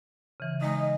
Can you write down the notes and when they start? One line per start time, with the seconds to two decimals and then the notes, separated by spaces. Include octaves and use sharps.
0.40 C#3 E3
0.61 G#3 D#4 D#5